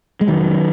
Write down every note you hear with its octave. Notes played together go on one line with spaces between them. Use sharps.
G#3
F1 D#3 F#3